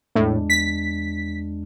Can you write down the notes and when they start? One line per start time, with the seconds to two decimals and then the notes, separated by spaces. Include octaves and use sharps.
0.15 E2 A2 G#3 D4
0.50 B6